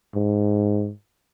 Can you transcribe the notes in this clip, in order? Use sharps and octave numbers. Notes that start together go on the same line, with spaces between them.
G#2